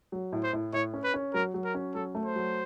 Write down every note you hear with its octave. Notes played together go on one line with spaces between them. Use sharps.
F#3
A2
C5
A2
A2 C#5
C#4
B4
C#4
F#3 A#4
F#3
A#4
C#4
F#3 A4
A3
C5
F#3